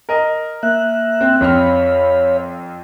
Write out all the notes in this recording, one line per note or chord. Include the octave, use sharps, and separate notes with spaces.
A#4 D#5
A#3 E5 F#6
C4
F2 C4 C#5 F5 B5 F6